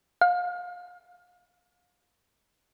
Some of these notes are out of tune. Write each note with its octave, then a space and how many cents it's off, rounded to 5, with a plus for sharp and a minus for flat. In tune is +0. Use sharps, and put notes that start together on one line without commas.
F5 +30